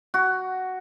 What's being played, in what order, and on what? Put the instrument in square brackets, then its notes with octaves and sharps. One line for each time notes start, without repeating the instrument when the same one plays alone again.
[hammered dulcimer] F#4